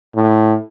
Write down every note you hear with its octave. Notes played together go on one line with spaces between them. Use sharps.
A2